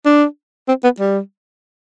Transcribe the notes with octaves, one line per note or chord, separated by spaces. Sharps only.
D4
C4
B3
G3